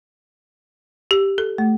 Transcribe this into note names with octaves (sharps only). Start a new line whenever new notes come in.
G4
A4
A3